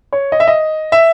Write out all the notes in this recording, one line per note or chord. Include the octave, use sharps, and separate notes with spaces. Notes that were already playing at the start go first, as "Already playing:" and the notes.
C#5
D#5
E5
D#5
E5